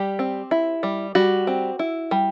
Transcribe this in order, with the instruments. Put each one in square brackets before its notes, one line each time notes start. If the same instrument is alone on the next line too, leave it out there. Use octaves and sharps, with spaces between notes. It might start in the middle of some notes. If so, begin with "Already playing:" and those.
Already playing: [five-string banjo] G3 G4
C4
E4
G3
G3 F#4
C4
E4
G3